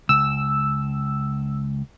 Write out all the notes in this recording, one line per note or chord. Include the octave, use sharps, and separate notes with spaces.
C#2 E6